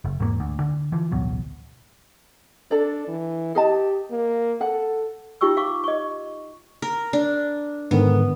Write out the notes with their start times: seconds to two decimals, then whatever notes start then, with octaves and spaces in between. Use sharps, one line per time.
0.05 F#1
0.20 E2 G#2 G3 A#3
0.40 D2
0.60 D3
0.92 E3 F3
1.12 A1 D2 B2 F#3
2.71 D4 A4 D5
3.08 E3
3.55 G4 G#4 D#5 A5
4.11 A#3
4.61 A4 F#5
5.41 D#4 F4 G4 G5 C#6 E6
5.57 F5 C#6 D6
5.84 D#5 C#6
6.82 A#4
7.13 D4
7.91 G#2 D3 D#3 B3